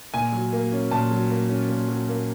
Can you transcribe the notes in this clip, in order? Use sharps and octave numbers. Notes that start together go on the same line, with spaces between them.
A#2 G#5
F#3
A#3
C#4
A#2 A5
F#3
A#3
C#4
A#2
F#3
A#3